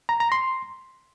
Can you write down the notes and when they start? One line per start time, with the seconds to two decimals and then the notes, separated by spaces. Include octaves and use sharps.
0.09 A#5
0.20 A#5
0.32 C6